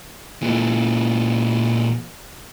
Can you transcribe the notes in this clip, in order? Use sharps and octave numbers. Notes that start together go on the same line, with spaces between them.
A#2 E3